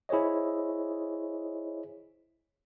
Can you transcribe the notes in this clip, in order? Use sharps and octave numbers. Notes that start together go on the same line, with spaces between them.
E4 G#4 C5 C#5 D#5